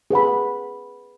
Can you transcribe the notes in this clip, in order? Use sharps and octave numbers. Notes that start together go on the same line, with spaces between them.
G#4 B4 F#5 B5